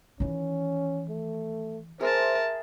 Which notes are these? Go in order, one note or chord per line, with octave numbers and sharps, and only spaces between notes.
D#3 E3 C#4
A3
G#4 A#4 C5 E5 A5 C6